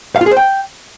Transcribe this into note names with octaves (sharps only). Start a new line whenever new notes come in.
F5
F4
G#4
C5
G5